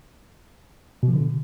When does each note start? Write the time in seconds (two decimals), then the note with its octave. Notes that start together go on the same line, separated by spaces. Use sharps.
1.03 B2
1.08 F3
1.13 D3